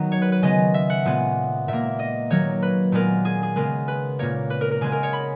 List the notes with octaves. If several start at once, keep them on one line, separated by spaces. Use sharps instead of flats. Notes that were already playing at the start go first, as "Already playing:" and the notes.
Already playing: D#3 F#3 B3
C#5
B4
B4
C#3 G#3 B3 D#5
E5
F#5
A#2 G#3 B3
A#2 A#3 E5
D#5
D#3 F#3 A#3 C#5
B4
A#2 G#3 B3 A#4
G#4
G#4
C#3 G#3 B3 A#4
B4
A#2 A#3 C#5
B4
A#4
A#4
C#3 G#3 B3 G#4
A#4
C#5
B5